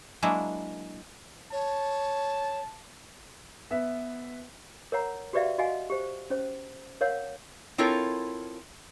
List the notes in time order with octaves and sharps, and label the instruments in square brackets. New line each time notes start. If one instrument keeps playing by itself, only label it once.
[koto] F#3 G#3 A#3 D4 E4
[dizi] C#5 [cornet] A5
[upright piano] B3 B4 E5
[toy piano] A#4 C#5 F#5 A#5
F#4 G4 B4 D5 E5 F5
F#4 D#5 F5 F#5 G#5
G4 C5
C#4 C5
A#4 C#5 F5 F#5
[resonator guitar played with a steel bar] C4 E4 F4 A4 A#4 C#5